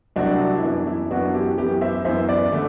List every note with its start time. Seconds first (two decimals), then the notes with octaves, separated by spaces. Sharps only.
0.16 C2 C3 F#3 C4 D4 F#4
0.54 E4
0.63 F#2 E3 B3 D4
0.87 E4
1.11 F#2 E3 B3 D4 F#4
1.34 E4 G4
1.58 F#2 E3 B3 G4 B4
1.81 C5 E5
2.05 F#2 E3 B3 C5 E5
2.28 B4 D5
2.52 D3 A3